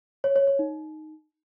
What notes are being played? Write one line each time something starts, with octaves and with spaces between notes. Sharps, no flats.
C#5
C#5
C#5
D#4